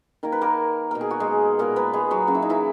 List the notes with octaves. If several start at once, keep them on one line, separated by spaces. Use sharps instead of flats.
D#3 A#3 A#4
B4
A#3 A#4
B2 A#3 A#4
G#4
F#4
G#3 G#4
A#2 G#3 A#3 B3 A#4
B3 B4
G#3 G#4
F#3 F#4
C#3 F#3 A#3 F#4
E4
D#4
E3 E4